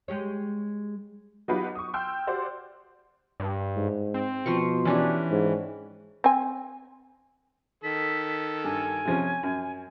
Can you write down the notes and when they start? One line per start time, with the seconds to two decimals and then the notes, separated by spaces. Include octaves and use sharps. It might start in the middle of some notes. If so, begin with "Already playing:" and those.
0.08 G#3 G4 C#5
1.48 F#3 B3 D#4 F4 G4 B4
1.75 C#6 D#6
1.94 G5 C6 E6 F6 G6
2.27 F#4 G4 C5 D5
3.40 G2
3.77 G#2
4.14 C4
4.46 B2 F3 C6 C#6
4.85 E3 C#4 D4 G4
5.31 G#2
6.24 C4 G#5
7.84 D#3 A4 B6
8.64 G2 G#5
9.05 C3 F3 C#4
9.43 F#2